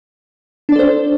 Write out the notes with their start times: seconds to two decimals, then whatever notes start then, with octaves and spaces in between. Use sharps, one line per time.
0.69 D4
0.72 D5
0.76 A4
0.79 C5